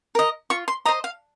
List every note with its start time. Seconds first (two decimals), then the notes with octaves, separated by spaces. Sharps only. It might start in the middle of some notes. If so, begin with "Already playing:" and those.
0.15 A#4 D#5
0.50 F4 C#6
0.68 C6
0.85 C5 D#5 A#5
1.04 F5